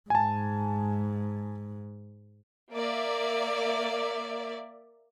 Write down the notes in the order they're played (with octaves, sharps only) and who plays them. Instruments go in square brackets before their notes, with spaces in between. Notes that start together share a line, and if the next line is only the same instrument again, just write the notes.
[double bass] G#2 [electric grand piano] G#5 A5
[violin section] A#3 D5 E5